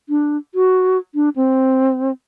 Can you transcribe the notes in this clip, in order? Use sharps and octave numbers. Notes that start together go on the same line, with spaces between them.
D4
F#4
D4
C4